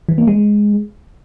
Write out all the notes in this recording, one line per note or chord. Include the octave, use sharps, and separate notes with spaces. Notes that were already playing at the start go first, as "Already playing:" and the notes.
E3
A#3
G#3